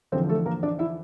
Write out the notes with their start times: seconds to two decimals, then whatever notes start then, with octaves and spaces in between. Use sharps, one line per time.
0.12 E2 D3 F3 C4 C5
0.29 A3 A4
0.46 A#3 A#4
0.63 D4 D5
0.79 E4 E5